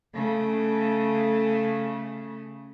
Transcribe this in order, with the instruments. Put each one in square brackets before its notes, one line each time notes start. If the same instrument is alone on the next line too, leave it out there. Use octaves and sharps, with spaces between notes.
[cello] C#3 A3